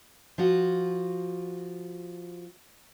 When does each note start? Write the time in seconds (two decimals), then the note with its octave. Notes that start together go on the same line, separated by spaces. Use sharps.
0.38 F3 F4 F#4